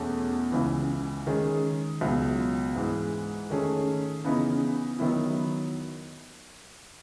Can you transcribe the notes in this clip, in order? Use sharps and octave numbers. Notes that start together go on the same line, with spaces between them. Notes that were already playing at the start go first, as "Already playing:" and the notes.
Already playing: E2 B2 A3 C#4 G#4
C#2 C#3 E3
D#3 G#3 C#4 G#4
C#2 B2 F#3
G#2 E3 G#3
D#3 A3 C#4 G#4
C#3 E3 B3 D#4 G#4
D#3 F#3 B3 E4